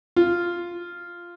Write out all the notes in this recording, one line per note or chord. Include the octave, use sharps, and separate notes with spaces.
F4